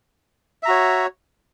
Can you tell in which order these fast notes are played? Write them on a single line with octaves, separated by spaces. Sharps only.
E5 A#5 F#4 C#5